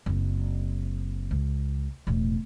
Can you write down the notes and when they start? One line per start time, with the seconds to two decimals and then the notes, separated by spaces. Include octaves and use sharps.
0.06 F#1 C4
1.31 C#2
2.07 E1 A2